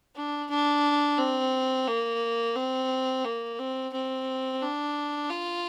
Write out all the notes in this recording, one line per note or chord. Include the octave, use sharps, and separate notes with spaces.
D4
D4
C4
A#3
C4
A#3
C4
C4
D4
F4